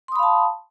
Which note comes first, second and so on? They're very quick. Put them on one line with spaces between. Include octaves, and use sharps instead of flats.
C6 D#6 B5 F5 A5